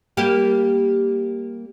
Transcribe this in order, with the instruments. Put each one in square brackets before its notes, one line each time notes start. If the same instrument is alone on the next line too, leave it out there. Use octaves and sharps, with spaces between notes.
[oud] G3 A#3 G4